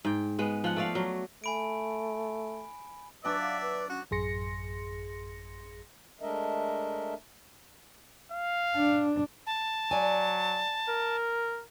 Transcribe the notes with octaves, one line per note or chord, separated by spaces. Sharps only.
G#2 G5
G#3 B3
F3 F#5
A3 D5 F5
F#3
A3 G#5 B5 D7
F#3 D4 B4 C#5 D5 E5
F5
B4
C#4 F#4
A1 F#2 G#4 C6 A#6 C#7
G#3 A3 D4 A#4 D#5 E5
F5
D4
A5
F#3 D5 G#5
A#4